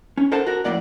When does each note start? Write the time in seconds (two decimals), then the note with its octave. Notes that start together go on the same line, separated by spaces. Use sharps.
0.17 C#4
0.32 A4 A#4 C5 F#5 A5
0.46 F#4 A#4
0.64 F2 A2 A#3 D5 F#5